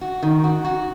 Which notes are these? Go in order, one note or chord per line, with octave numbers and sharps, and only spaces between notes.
F#4
D#3
F#4
F#4